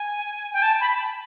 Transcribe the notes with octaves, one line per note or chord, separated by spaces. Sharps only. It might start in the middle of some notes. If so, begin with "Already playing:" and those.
Already playing: G#5
G5
A5
B5